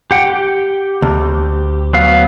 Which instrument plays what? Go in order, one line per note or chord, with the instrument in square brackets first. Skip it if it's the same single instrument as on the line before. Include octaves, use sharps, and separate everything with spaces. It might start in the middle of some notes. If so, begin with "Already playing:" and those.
[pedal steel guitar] G4 F#5 G5
G4
[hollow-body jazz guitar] D2
[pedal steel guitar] F#3 B3 F5